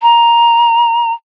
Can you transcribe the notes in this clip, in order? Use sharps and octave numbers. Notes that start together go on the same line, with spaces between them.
A#5